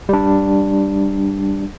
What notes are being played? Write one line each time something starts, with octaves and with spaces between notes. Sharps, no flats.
G3 D4